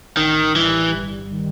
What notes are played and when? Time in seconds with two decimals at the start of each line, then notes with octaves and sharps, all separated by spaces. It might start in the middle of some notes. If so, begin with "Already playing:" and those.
0.17 A1 D#3
0.56 E3 G3
0.94 G1
1.32 D#3